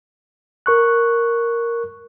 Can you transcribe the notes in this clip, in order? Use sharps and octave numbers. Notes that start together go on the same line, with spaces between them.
A#4 C#6 F#6